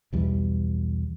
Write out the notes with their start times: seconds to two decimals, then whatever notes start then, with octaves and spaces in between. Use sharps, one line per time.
0.13 B1 E2 G3